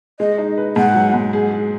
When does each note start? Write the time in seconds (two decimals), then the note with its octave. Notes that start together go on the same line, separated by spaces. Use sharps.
0.20 G#3 D#5
0.38 D#4
0.58 B4
0.76 G#2 F#5
0.95 F#3
1.14 G#2
1.33 G#4
1.51 G#4